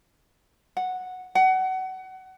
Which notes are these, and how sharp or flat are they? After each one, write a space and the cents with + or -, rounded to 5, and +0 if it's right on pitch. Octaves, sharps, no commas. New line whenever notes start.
F#5 -5
F#5 +25